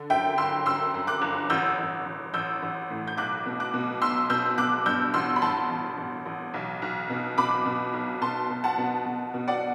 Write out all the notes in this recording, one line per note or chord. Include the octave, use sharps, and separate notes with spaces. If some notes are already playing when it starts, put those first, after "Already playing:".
Already playing: D3
F#2 E5 G5
G1 C6 E6
F#2 C6 E6
F#2
D6 F#6
G1
A1 E6 G6
A1
A1
A1 E6 G6
A1
A2
G6
B1 D6 F#6
B2
D6 F#6
B2
B1 C6 E6
B2 E6 G6
B2 D6 F#6
G2 E6 G6
A1 C6 E6
B5
A1 A5 C6
A1
A1
A1
B1
B1
B2
B2 B5 D6
B2
B1
B2 A5 C6
B2
F#5 A5
B2
B2
B2
D5 F#5